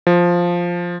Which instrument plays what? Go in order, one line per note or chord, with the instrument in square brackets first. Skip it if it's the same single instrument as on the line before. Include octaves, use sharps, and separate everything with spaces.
[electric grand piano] F3